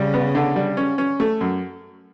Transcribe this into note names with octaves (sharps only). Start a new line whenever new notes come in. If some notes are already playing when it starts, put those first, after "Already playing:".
Already playing: C#3 G3
B3
D3
G3
C#4
C#4
A3
F#2